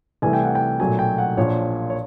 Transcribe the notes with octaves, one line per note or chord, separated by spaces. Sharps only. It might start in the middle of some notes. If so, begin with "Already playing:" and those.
C2 C3 E3 A3 G#5
G5
F#5
G5
B1 A#2 F#3 A3 G#5
G5
F#5
A#1 A#2 F3 A#3 C#5
C#5